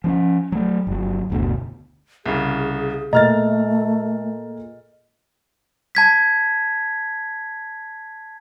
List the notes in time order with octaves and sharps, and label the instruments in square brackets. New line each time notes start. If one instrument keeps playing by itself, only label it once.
[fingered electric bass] F3 C4 C#4
F#3 A3
G1 F#3
F#1 D2 B2
[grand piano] C2 C#3 [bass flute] G#4
[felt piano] A#2 G#4 A4 [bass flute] A3 [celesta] D#5 [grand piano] A#5 F6 A6
[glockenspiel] A5 G#6 B6